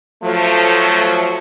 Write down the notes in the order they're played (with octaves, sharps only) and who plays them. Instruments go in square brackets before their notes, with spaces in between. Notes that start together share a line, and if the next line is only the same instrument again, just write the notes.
[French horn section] F3 F#3 A3